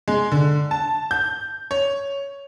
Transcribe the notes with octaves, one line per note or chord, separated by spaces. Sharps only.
G#3
D3
A5
G6
C#5